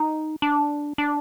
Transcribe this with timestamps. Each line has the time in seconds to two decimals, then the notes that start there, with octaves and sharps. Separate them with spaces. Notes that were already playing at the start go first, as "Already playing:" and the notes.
Already playing: D#4
0.42 D4
0.98 D4